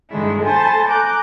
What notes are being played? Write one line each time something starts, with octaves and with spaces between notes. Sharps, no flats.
G2 D3 D#3 G#3 D4 E4
A4 C5 G#5 A5 B5 A6
G#5 A#5 D6 F#6 G6